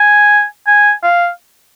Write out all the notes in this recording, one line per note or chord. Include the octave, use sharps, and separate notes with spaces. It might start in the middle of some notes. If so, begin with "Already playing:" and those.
Already playing: G#5
G#5
F5